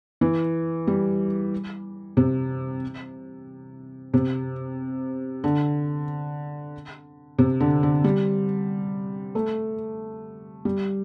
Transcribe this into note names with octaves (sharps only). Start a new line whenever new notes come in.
E3
G3
C3
C3
D3
C3
D3
D3
G3
A3
G3